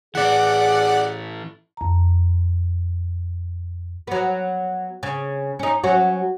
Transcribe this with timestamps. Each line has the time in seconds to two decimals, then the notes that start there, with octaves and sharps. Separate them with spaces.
0.15 A2 E3 G#4 D5 F#5
1.77 F2 A#5
4.07 F#3 B3
5.03 C#3
5.59 C#4 D#4
5.83 F#3 C#4 F#4